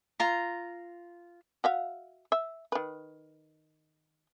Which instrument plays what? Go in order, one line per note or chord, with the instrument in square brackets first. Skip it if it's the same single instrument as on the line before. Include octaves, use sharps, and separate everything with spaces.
[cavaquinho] F4 A#5
[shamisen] F#4 E5 F5
E5
D#3 B4